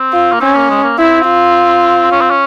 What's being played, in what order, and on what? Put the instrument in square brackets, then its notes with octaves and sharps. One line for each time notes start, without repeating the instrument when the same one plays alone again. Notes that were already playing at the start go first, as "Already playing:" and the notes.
Already playing: [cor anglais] C4
[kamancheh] F4
[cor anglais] A#3
[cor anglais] C4 [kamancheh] C#4
[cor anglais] A#3
G#3
A#3
[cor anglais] C4 [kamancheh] E4
[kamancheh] F4
[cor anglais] C#4
C4
C#4